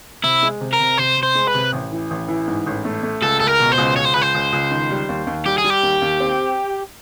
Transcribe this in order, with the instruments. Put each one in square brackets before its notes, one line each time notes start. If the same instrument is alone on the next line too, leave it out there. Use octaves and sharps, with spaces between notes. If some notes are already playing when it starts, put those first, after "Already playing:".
[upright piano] C3 [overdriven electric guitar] E4
[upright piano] G#3
C3
[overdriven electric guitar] A#4
[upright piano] C3
[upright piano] C3 [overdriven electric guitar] C5
[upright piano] C3
[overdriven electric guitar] C5
[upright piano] G#3
[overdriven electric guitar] B4
[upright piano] C3
A1
E3
A1
E3
G#2
A1
A3
A3
[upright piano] C#2 [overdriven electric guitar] A4
[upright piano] C#2 [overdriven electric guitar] A4
[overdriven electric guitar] A#4
[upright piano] B2
[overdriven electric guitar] C5
[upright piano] C#2
[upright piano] C#2 [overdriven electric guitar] C#5
[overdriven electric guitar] C5
[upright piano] C#2 [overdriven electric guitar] B4
[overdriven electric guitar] C5
[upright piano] C#2
C#2
D#3
G3
D#2
D#2
[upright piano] G3 [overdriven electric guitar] G4
[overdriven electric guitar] G#4
[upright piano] G3
[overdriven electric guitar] G4
[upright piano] D#2
D#2
C4